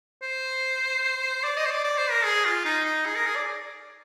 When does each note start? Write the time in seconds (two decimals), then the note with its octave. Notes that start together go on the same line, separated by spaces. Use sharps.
0.22 C5
1.44 D5
1.57 D#5
1.65 C5
1.71 D5
1.84 D5
1.98 C5
2.11 A#4
2.24 G#4
2.45 F4
2.65 D#4
2.85 D#4
3.06 G#4
3.16 A#4
3.26 G#4
3.36 D5